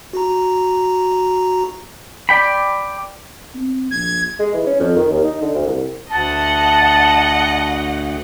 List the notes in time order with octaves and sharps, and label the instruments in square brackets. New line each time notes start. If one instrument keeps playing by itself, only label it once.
[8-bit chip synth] F#4 A#5
[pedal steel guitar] D5 G5 B5
[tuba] C4
[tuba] A#1 [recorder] G#6
[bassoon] G#3
E3
C#4
F2
D#3
D#2
D#4
D3
D2
C2
[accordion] D2 [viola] D#5 F#5 [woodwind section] A5